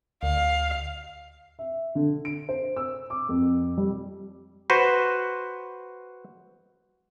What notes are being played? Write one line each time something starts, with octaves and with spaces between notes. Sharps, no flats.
D2 F5
E5
D3
D7
C5
E6
D6
F2
G3
F#4 B4 C5